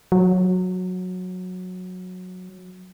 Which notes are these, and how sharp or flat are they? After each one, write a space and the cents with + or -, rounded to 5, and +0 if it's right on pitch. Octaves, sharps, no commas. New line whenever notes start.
F#3 -15